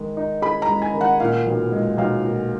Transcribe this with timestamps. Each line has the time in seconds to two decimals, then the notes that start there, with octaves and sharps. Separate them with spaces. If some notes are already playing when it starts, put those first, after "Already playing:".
Already playing: D#3 G#3
0.17 D#4
0.42 G#4 B5
0.62 A#5
0.69 G#3
0.82 G#5
0.94 D#3
1.01 F#5
1.20 A#2 F5
1.46 B1
1.72 G#3
1.98 B1 F5
2.24 A#2